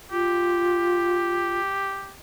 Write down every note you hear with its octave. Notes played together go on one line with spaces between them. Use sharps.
F4 G4